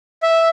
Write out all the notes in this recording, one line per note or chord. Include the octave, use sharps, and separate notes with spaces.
E5